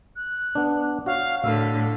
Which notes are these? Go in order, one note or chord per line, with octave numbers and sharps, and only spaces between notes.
F#6
B3 D4
F#4 C#5 F5
A2 D3 F5 E6